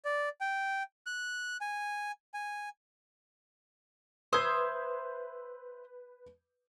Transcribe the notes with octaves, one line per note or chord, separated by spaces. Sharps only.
D5
G5
F#6
G#5
G#5
B4 C5 E5 D#6 G6 G#6